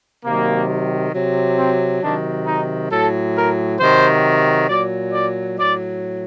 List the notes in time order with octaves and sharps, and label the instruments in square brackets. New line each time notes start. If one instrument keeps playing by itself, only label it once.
[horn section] C3 D#3 F#3 A#3
C3 F#3
C4
C3 D#3 F#3 D4
D#4
A2 F#3 A4
A#4
C3 D#3 F#3 C5
A#2 F#3 D5
D5
A2 F#3 D5